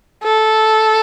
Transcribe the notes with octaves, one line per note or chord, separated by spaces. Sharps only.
A4